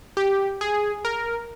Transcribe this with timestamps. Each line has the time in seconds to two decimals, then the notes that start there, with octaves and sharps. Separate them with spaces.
0.17 G4
0.61 G#4
1.05 A#4